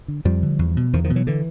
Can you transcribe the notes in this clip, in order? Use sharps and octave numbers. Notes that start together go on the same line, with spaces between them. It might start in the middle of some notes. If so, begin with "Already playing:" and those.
D3
F2 F3 G3
D3
E2
B2
E2 D#3 F3
D#3 F3
B2
E3 F#3
D3 E3